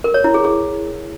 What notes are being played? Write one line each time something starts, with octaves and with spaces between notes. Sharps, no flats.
A#4
C#5
E4
G#4
G#4